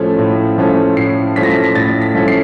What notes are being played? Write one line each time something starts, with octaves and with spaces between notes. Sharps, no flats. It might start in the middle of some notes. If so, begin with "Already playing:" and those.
Already playing: A2 F3 A3 C#4
A2
F3 A3 C#4
A2 C7
F3 A3 C#4 B6
A#6
B6
A#6
A2 A6
B6
F3 A3 C#4
C7